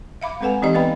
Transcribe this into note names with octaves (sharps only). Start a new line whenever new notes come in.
E5 F5 B5 D6
G#3 C4 A4 B4 F#5 G#5
E3 C4 D#4 G4 D5 D#5
B3 B4 F5 G5 B5